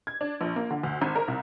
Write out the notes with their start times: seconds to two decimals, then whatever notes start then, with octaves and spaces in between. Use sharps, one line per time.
0.07 G#6
0.21 D4
0.41 A#1
0.56 A#3
0.70 D3
0.83 D2
1.02 G#1
1.15 A#4
1.28 C2